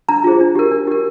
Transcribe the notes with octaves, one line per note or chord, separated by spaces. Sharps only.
D4 A#5
F4 G#4 C5
D4
G4 A#4
D4
G4 A#4